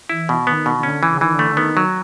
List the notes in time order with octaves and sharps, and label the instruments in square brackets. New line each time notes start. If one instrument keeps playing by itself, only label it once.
[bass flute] E3 [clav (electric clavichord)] E4
[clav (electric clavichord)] B2
[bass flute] D#3 [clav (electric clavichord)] B3
[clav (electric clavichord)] B2
[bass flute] D#3
[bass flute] D3 [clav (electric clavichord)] C#4
[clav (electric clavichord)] E3
[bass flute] C#3
[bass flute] D#3 [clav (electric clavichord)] E3
[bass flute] D3
[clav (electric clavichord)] A3
[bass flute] D3
[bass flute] D#3 [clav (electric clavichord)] B3
[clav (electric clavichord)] F#3